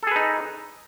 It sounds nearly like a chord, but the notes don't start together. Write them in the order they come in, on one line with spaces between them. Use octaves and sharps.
A4 G#4 B4 D#4